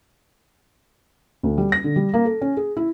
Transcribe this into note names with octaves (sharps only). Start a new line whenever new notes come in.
D2
G3
A#6
D3
G3
A#3
A4
C#4
G#4
E4